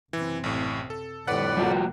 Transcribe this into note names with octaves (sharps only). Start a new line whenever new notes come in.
F#1 C3 E3 C4
A1 A2
A4
F2 A2 D3 G3 B4 D5 F#5 F#6
F1 G3 A#3 F4 F#4